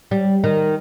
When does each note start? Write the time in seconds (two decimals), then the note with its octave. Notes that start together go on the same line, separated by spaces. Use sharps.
0.11 G3
0.44 D#3